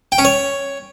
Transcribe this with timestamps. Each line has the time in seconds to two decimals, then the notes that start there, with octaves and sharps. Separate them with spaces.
0.12 G5
0.18 C#4
0.25 C#5